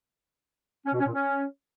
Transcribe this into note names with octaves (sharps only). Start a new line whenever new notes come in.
C#4
B2
C#4
A#2
C#4